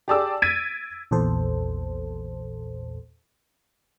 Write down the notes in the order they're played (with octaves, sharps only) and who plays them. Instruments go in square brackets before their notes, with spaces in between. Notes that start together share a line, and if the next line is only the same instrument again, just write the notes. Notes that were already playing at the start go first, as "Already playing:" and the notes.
[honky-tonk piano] G4 G#4 D5 A5 D6 E6
G#6 A6 B6 D7 D#7
[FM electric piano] A#1 E2 A#2 A4 C5